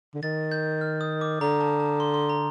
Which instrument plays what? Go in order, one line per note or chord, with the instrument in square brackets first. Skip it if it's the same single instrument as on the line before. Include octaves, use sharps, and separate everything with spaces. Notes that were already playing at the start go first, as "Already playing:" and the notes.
[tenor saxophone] D3
[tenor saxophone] D#3 [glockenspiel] A6
[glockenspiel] G6
F6
D#6
D6
[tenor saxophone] D3 [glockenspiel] A#5
[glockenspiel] A5
A5
C6
C6
A#5